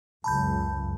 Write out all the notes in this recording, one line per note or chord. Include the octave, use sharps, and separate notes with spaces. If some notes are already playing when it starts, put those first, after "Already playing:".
C#2 F#2 A5 B5 G6